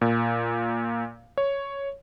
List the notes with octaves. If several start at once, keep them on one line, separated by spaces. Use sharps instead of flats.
A#2
C#5